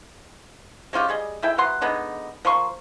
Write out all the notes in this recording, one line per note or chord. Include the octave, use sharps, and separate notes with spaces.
G#3 C#4 F4 G4
G3 G#4 D#5
G#3 E4 A4 G5
F#3 B3 F#5 C6
D3 G#3 B3 D#4
F3 A#3 C6 C#6